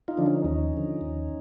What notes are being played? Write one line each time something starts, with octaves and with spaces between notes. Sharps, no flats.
D#4 F4
D3 F3 D4
C#4 D#4
D#2 C#4 D#4
D3 F3
D#2